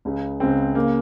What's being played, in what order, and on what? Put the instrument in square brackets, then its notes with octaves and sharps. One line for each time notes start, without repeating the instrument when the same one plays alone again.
[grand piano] C#2 C#3
C#2 C#3 C4
C#3 A#3